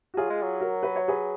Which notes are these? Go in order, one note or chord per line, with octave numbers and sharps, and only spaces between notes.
F#4
F#3 F4 G#4
G#3
F#3
F#4 A#4
B4
C#5
G#4 B4